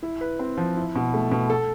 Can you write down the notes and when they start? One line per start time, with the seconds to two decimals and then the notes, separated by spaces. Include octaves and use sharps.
0.03 E4
0.21 B4
0.39 C4
0.57 F3
0.77 E4
0.95 B2
1.14 A3
1.32 B2
1.50 A4